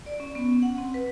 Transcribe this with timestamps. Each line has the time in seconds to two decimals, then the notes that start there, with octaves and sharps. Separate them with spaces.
0.06 D5
0.20 C#4
0.35 B3
0.49 C#4
0.63 F#5
0.78 C4
0.94 B4